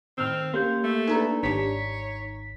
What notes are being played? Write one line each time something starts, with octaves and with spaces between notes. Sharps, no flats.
A2 D#3 C4 E6 F6
A#3 C#4 G4 G6
A3
D4 D#4 A4 B4 A#5
G#1 D#3 G3 D4 C#5 B6